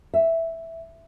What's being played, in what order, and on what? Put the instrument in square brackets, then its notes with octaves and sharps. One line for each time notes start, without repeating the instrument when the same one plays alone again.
[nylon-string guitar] E5